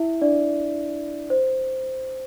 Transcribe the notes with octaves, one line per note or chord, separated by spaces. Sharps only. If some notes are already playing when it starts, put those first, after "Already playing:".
Already playing: E4 E5
D4 D5
C5